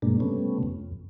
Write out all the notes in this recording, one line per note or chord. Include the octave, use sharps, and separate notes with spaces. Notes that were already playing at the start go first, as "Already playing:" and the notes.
G2 B2 G#3 A#3 D4
C3 G3 A3 B3 C#4
F2